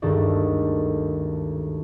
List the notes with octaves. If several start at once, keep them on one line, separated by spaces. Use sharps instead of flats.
G#1 D2 G2 D#3 A4